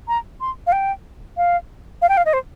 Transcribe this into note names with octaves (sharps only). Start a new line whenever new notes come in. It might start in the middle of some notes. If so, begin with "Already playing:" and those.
A#5
C6
F5
G5
F5
F5
G5
F5
D#5
C5